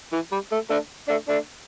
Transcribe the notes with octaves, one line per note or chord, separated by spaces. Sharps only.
E3
G3
A3
A3 D4
A3 D4
A3 D4